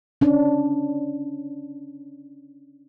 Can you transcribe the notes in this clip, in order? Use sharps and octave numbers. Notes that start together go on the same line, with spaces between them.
C#4 D4